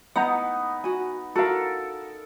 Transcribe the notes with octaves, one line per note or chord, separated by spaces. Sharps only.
B3 D#4 F#5 A#5
F#4 G#5
F#4 A4 A#4 F5